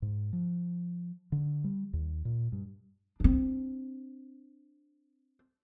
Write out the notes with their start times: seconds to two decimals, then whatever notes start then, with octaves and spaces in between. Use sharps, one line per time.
0.02 G#2
0.33 F3
1.32 D3
1.64 G3
1.93 D#2
2.25 A#2
2.52 G2
3.20 C4 D4